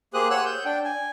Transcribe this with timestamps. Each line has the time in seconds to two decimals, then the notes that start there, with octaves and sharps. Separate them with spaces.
0.14 A#3 G4 G#4 C5 D#6 F#6
0.30 C#5 F#5 E6 F#6
0.46 G6
0.65 D4 G5
0.85 G#5